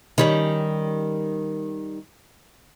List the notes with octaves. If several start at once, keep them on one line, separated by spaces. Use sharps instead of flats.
D#3 G3 C#4